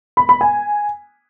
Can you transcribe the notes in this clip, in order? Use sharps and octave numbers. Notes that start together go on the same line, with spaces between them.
B5
B5
G#5